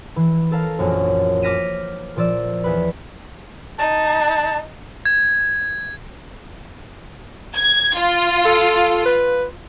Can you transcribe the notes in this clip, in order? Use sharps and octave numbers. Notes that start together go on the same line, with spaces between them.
E3
A4 A#4 F5
A#1 F#2
D6 F6 A#6 B6 D#7 E7
A#2 F3 D5 E6 E7
E2 B4
D#4 A5
G#6
G#6
F4
A4
B4